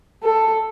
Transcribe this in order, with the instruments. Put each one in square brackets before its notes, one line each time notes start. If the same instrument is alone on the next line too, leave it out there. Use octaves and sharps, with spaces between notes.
[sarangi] A4